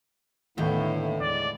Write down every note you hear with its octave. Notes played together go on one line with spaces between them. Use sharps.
D#2 A2 D3 B3 E4 G5
G#3 D5